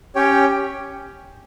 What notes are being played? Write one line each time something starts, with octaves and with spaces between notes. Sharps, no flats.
C#4 G4 C#5 G5